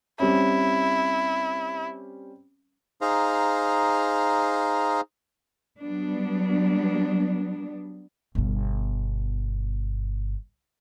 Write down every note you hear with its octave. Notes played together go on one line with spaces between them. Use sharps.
G3 C4 C#4 E4
D#4 G#4 C5 F5 A#5
F#3 G3 B3 D4
G1 B2